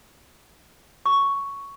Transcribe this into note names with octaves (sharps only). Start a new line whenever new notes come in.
C#6